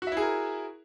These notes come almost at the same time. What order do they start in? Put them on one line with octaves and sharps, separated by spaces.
F#4 E5 E4 G#4 A#4